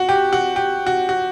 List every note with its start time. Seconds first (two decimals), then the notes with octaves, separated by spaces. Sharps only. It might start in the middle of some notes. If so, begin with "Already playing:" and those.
Already playing: F#4
0.09 G4
0.33 F#4
0.56 G4
0.87 F#4
1.09 F#4